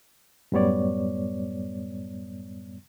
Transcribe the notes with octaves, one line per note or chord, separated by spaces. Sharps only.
F#2 A2 G3 B3 C#5 D5